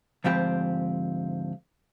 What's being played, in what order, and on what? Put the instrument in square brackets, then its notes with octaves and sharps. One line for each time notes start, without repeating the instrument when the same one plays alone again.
[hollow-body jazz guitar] D2 G#2 F3 C4 G4 B5